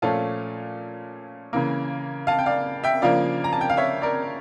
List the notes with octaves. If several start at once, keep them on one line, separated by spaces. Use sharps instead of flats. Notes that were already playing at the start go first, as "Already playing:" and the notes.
A#2 F3 A3 C#4 F4 F5 A5
C#3 E3 A#3
F5 A5
G5
D5 F5
E5 G5
C#3 F3 A#3 D4 D5 F5
A#5
A5
G5
F5
C#5 E5
A#4 D5